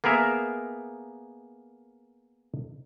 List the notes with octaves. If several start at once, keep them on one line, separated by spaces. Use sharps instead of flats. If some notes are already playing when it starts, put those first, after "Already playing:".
A#3 B3 G#4 A#4 E5